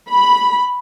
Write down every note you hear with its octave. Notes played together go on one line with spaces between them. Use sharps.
B5